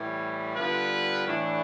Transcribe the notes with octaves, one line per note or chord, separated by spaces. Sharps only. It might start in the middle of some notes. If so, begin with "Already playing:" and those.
Already playing: A2 E3 G3
D3 G3 B3 F4 B4
A2 E3 A3 D4